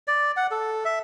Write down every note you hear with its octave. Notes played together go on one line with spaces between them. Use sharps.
D5
F#5
A4
E5